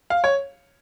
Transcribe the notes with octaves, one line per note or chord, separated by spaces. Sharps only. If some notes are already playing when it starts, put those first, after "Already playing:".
F5
C#5